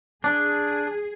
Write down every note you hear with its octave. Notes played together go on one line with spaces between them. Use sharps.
D4 G#4